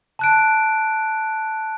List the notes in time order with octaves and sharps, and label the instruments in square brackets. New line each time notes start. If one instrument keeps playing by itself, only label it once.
[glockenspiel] A5 F#6 D7